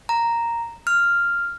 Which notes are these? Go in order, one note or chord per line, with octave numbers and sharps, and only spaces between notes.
A#5
F6